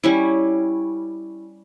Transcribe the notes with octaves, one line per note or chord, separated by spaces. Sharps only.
G3 C#4 E4